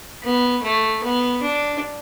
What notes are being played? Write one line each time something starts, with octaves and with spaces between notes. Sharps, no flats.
B3
A3
B3
D4